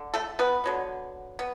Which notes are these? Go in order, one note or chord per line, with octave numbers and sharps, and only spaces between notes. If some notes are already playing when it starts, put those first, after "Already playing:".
Already playing: D3
A3 A4
B3 B4
D3 F#3 B3
B3